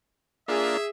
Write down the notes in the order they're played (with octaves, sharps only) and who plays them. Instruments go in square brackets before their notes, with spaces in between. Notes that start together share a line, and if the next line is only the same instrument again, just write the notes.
[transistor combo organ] A#3 D4 F4 [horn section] G#4 E5